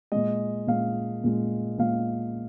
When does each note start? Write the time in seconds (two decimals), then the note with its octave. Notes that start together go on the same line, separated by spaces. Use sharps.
0.12 A#2 G#3 D#5
0.67 A#2 G#3 F5
1.24 A#2 G#3
1.79 A#2 G#3 F5